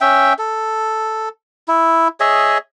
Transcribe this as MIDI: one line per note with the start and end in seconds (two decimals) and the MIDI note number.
0.01 0.33 61
0.01 0.33 76
0.01 0.33 79
0.39 1.29 69
1.68 2.08 64
2.20 2.58 68
2.20 2.58 73
2.20 2.58 75
2.20 2.58 76